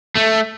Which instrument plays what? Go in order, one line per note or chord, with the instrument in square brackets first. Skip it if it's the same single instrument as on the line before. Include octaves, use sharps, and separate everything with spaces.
[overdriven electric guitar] A3